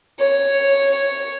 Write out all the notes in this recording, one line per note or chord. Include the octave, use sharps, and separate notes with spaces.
C#5